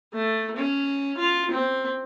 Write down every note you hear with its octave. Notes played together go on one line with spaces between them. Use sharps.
A3
C#4
F4
C4